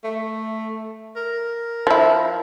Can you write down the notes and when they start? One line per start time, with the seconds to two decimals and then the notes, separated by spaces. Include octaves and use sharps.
0.05 A3
1.16 A#4
1.87 F3 E4